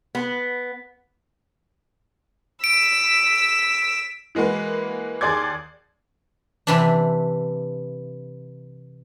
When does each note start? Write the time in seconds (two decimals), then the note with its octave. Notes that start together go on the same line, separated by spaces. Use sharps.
0.15 B3
2.64 E6 B6 D7
4.35 E3 G#3 A#3 F#4 B4
5.21 D#2 G#4 D5 C6 D6 G#6
6.67 C3 E3 D4